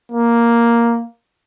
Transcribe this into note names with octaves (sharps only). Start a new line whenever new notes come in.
A#3